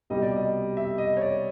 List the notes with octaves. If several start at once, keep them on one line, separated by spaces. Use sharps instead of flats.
C2 B2 G3 D#5
D5
D#5
E5
D#5
C#5
D5